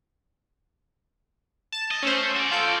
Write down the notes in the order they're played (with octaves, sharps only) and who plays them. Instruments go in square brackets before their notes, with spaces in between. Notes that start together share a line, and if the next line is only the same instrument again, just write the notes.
[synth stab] A5 E7
[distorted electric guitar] D#5
[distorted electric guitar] A3 [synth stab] C#4 C5
[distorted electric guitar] F#4 D5
[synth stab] F4 A4 G6